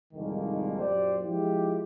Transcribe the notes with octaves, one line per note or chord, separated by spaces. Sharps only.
C2 F2 G#2 D3 D#3 A#3
F#2 A#2 G4 C5 D5
F3 G#3 E4 F4 G4